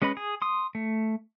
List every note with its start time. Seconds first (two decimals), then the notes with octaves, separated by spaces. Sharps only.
0.02 G#3 C#4 B4 D#5 B5
0.17 G#4
0.42 C6 D#6
0.75 A3